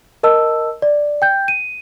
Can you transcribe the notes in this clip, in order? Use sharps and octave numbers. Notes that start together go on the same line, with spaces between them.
A#4 D#5 A5 E6
D5
G5 G6
D#7